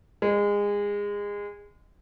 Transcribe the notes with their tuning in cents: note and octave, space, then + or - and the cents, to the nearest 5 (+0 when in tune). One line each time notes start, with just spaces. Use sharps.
G#3 -25